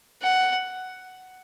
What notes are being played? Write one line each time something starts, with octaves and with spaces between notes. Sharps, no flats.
F#5